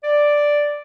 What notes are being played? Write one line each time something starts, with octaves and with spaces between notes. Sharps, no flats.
D5